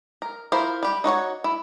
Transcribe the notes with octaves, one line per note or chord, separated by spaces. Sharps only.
A#4
E4 F4 A#4 C5
G3 G4
D#4 F#4 C#5 F#5
E4